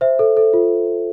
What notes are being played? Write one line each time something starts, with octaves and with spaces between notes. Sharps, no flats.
C5 E5
A4
A4
F4